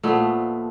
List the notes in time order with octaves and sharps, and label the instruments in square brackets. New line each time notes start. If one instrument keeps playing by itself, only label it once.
[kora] A#2 F3 A3 B3